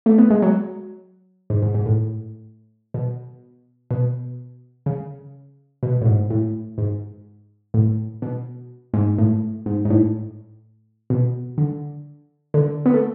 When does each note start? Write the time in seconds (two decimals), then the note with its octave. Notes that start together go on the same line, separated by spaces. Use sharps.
0.06 A3
0.18 B3
0.30 G#3
0.42 F#3
1.50 G#2
1.62 G#2
1.74 G#2
1.86 A2
2.94 B2
3.91 B2
4.86 C#3
5.83 B2
6.01 A2
6.06 G#2
6.30 A2
6.78 G#2
7.74 A2
8.22 B2
8.94 G#2
9.18 A2
9.66 G#2
9.85 G#2
9.90 A2
11.10 B2
11.58 D3
12.54 D3
12.86 B3
12.94 A3